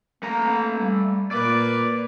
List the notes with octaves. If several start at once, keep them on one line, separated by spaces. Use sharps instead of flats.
A3 A#3 A#5
G3
A#2 A#3 B4 D5